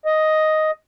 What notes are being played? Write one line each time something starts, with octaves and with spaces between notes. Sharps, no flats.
D#5